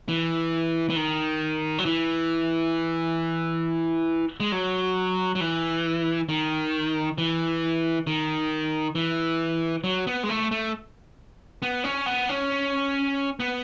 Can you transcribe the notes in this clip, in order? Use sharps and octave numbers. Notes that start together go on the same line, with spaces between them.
E3
E3
D#3
F#3
E3
G#3
F#3
F#3
E3
D#3
E3
D#3
E3
F#3
B3
G#3
A3
A3
B3
C#4
B3
C#4
B3